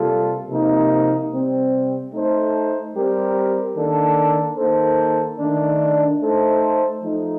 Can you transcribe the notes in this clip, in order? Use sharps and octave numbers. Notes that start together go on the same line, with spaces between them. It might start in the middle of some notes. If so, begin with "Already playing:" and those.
Already playing: C3 G3 A#3 F4 A4
C3 F3 A#3 D#4
C3 G3 C4
A3 D#4 A4 C5
G3 C4 G4 A#4
D#3 A#3 D4 A4
D#3 A#3 D#4 A4 C5
D#3 A3 D4
A3 D#4 A4 C5
F3 A3 D#4